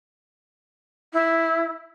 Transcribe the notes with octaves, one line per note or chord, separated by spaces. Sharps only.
E4